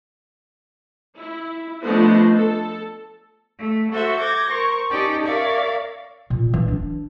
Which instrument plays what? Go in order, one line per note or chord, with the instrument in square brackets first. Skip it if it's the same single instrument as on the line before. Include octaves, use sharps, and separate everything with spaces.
[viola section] E4
F3 A3 B3 D4 C5 D#5
A4
[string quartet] A3
F#4 A4 C5 E5
D6 G6 G#6 A#6
A#4 C5 C#6
C#4 D#4 G4 D5 G5 A5
A#4 C#5 D5 E5 F5
[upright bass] A#2
E3
D4